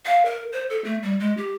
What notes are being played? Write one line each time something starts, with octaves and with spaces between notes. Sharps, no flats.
F5
A#4
C5
A4
A3
G3
G#3
G4